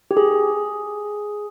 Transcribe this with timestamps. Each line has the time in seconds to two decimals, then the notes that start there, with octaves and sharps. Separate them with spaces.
0.11 G4
0.17 G#4